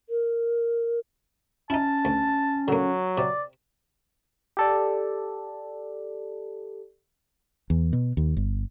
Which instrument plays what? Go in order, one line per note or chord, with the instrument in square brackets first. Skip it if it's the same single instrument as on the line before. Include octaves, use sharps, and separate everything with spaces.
[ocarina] A#4
[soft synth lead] C#4 [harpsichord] D#4 E4 [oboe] A5
[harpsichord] D2
[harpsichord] D3 A#3 [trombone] F#3
[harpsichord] C3 [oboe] D5
[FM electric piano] G4 A4 D5
[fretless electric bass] E2
B2
D#2
G1